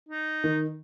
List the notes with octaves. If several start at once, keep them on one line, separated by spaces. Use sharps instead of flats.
D#4
D#3